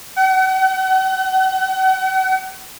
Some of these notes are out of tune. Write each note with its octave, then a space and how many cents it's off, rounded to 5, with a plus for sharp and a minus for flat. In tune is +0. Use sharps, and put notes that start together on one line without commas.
F#5 +40